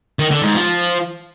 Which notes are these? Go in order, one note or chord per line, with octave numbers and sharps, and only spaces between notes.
D#3
D3
G#2
F3